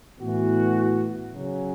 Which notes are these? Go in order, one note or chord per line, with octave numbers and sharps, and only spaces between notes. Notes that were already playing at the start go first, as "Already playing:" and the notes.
A2 E3 B3 F#4
C#3 F#3 C#4